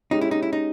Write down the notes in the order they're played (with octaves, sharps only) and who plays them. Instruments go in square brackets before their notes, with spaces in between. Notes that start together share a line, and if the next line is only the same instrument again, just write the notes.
[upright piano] G#3 C#4 G4 [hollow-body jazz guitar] D#4
[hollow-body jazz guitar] E4
D#4
E4
D#4